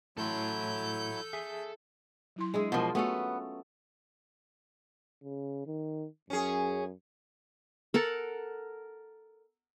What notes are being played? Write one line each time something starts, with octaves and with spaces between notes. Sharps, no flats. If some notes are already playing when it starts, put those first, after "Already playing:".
A2 F#3 E4 A4 C6 G6
G#4 E5
F#3 E4 C6
G#3 D4 E4 G#4
B2 F3 F4 A#4 F5 F#5
A3 B3 C#4 F#4 A4
C#3
D#3
F#2 C#4 G#4
A4 A#4 F#5 A5